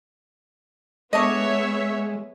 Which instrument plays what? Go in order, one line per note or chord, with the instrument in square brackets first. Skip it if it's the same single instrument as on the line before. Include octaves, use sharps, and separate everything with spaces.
[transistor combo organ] G#3 [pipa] A3 D4 D#5 [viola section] B3 C#5 E5